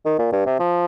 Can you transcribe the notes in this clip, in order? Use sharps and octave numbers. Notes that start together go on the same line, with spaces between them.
D#3
A#2
G2
C3
F3